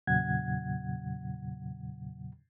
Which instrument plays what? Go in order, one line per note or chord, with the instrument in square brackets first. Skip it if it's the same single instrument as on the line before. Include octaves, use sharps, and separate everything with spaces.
[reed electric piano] E2 A#2 C#3 F#3 F#5 G#6